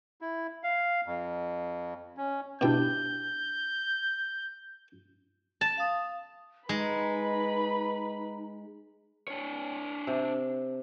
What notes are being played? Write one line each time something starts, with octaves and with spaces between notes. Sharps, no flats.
E4
F5
F2
C#4
B2 D4 E4 G4 G5 G6
A5
F5 D#6
G#3 D#4 B4 B5
D4 C#5
C3